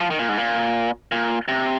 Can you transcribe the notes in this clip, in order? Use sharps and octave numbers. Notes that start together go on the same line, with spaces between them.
F3
D#3
A#2
G#2
A#2
A#2
C3